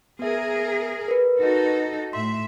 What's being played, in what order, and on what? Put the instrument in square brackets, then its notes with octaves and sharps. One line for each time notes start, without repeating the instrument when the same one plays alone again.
[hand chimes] B3 E5 [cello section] G#4 A#4
[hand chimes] A#4 B4
[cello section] D#4 F#4 A4
[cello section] A2 E5 [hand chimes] C6